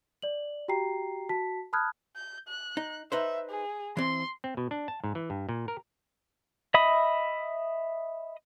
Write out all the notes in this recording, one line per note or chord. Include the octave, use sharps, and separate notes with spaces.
D5 F#7
F#4 G4 G5 A#5 C7
F#4 A5 B6
A5 B5 D#6 F6 F#6 G#6
G6
F#6
D#4
D#4 B4 C5 E5
G#4
E3 C4 C6
C4
B2
D4
A5
G#2
E3
G2
A#2
A#4
D#5 E5 B5 D#6